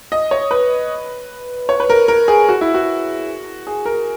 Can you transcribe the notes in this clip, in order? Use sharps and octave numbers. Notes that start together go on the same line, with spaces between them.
D#5
C#5
B4
C#5
B4
A#4
A#4
G#4
F#4
E4
F#4
G#4
A#4